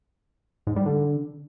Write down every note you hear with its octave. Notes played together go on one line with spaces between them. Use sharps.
G#2
G3
D3